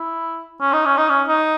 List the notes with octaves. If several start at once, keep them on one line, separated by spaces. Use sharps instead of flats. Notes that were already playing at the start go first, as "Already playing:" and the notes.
Already playing: E4
C#4
D#4
C#4
D#4
C#4
D#4